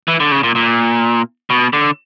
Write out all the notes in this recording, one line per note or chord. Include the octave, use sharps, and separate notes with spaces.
E3
D3
C#3
A#2
A#2
B2
D3